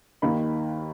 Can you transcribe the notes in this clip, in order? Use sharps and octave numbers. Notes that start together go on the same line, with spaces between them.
D#2 D#3 A#3 B5